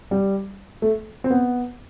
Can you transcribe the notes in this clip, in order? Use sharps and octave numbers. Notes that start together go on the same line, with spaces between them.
G3
A3
C4
B3